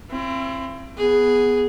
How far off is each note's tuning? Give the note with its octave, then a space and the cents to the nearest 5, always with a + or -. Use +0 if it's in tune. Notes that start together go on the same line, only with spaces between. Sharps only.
C4 +25 E4 +45
B3 +0 G#4 +0